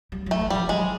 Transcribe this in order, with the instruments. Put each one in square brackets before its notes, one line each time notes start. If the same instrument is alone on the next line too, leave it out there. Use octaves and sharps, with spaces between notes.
[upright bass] G3
[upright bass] F#3 [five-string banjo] A3
[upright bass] E3
[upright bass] F3 [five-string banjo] G3
[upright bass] F#3 [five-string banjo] G#3